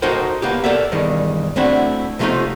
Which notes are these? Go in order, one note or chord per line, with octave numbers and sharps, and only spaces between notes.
D#4 F#4 A4 A#4 C5 G5
A#3 B3 G4
A4 A#4 D5 E5
E2 G2 D#3 E3
A3 C4 D4 E4 F#4
C3 F3 A3 C#4 D#4 F4